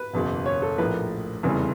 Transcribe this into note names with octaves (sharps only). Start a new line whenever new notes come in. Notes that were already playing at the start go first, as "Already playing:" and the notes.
Already playing: B4
F#1 E2 B2
C#5
A4
A#1 A2 F3 A#3 B4
F1 E2 C#3 E3 G3